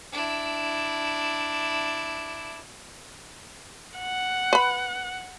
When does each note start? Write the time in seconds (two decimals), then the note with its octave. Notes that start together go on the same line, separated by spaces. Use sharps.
0.12 D4 E4
3.99 F#5
4.53 B4 B5